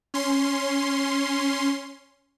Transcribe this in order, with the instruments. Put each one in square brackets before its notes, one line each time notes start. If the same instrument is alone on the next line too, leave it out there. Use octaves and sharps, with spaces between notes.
[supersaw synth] C#4 C6